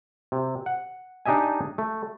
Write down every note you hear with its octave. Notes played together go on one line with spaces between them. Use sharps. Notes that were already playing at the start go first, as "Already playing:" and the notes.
C3
F#5
D4 D#4 G4 D#5 E5 G#5
A3